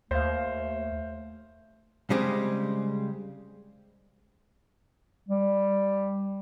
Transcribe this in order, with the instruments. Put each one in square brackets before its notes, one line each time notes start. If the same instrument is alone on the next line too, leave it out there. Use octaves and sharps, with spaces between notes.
[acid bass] D#2 [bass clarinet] A3 [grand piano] C5 F5
[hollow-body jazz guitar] C#3 G3 G#3 C4
[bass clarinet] G3